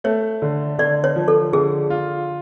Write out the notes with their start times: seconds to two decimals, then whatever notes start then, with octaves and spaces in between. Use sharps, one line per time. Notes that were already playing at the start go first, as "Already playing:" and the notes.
0.04 A3 C#5
0.42 D3
0.79 D3 D5
1.04 C#5
1.16 F3
1.28 A4
1.53 D3 G#4
1.90 F4